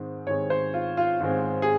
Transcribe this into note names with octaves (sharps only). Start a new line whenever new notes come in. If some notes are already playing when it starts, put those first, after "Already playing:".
Already playing: G#2 D#3 G#3 C4
G#2 D#3 G#3 C4 C#5
C5
F4
F4
G#2 D#3 G#3 C4 F4
G#4